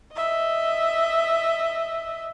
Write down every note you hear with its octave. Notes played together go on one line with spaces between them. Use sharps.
D#5 E5